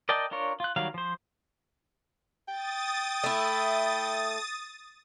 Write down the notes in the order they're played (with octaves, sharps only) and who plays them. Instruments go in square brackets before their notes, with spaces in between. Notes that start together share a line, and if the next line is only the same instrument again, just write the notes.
[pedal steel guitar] A#4 D5 D#5 G5 A5
D4 F4 A#4 C#5
F4 F#6
D#3 F#3 G3 F5
F3 C5
[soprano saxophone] G5 [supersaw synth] D#6 A6
[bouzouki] A3 E4